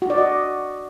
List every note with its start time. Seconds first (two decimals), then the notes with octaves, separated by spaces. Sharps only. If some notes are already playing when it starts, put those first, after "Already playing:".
0.02 F#4
0.10 D5
0.18 D#5